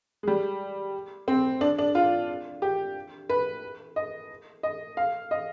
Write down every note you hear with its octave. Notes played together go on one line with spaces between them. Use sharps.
G#3
G3
C4
D4
D4
F4
G4
B4
D#5
D#5
F5
D#5